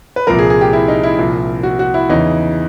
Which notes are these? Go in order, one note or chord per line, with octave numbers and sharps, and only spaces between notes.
B4
C2 A#2 F3 A#4
G#4
G#4
G4
E4
D#4
E4
C2 A#2 F3
F#4
F#4
E4
E2 C#3 E3 D#4